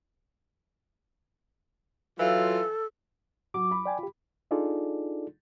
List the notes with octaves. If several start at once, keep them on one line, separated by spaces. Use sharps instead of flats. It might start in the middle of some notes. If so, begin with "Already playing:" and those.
E3 F#3 F4 A4
F#3 D6
B5
D5 G5 G#5
F4 G4
D4 D#4 F4 G#4 A4 D5